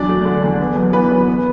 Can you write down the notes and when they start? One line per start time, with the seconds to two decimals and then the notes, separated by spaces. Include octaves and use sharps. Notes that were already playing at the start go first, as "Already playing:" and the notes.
Already playing: E2 F#3 D4 D5
0.09 A3
0.25 D3
0.43 E2
0.59 B3
0.76 F#2
0.93 E3 B3 B4
1.11 F#2
1.28 B3